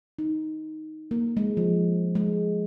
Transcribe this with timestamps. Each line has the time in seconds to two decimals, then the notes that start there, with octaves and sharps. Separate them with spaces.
0.19 D#4
1.11 A#3
1.37 G#3
1.57 F3
2.15 G#3